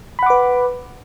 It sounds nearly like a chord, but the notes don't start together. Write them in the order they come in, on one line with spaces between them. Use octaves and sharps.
B5 F#5 D6 B4